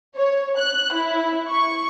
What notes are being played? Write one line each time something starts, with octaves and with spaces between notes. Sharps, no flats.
C#5
F#6
E4
C#6